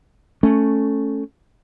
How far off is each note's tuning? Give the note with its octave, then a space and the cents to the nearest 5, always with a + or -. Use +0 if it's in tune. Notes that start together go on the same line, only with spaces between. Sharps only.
A3 +0 C#4 +0